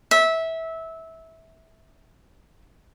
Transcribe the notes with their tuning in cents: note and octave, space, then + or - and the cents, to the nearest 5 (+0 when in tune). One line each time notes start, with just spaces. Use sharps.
E5 -20